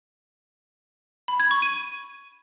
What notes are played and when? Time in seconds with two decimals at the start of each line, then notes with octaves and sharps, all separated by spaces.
1.28 B5
1.40 G#6
1.51 C#6
1.62 D#7